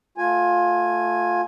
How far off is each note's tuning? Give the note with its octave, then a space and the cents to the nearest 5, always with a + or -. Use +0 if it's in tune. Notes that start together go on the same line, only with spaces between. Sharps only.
A3 +0 F4 +20 G#5 +0